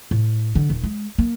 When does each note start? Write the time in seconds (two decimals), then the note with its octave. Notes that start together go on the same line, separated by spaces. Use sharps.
0.11 A2
0.55 D3
0.70 D#1
0.83 G#3
1.18 A#3